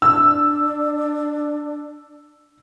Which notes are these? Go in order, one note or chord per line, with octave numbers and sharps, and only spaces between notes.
D4 E6